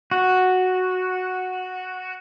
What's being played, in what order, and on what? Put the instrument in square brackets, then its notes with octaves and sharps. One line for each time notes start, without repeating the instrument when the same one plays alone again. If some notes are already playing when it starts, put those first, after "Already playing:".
[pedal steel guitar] F#4